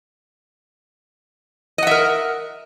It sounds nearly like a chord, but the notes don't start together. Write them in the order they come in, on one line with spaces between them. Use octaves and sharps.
D#5 F#5 E5 A#4